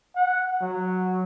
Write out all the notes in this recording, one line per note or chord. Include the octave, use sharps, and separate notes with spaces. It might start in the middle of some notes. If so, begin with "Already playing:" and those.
F#5
F#3